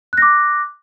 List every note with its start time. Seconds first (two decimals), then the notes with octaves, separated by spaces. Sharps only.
0.13 F#6
0.18 A#6
0.22 D6